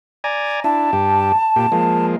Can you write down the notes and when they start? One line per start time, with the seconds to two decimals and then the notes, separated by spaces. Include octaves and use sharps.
0.24 D5 G#5 A#5
0.64 D4 E4 A5
0.93 G2 G4
1.56 A#2 G4
1.72 F3 G#3 A#3